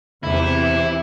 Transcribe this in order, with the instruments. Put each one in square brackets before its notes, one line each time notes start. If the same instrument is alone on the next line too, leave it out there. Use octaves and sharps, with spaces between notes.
[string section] E2 C3 E3 [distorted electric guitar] E4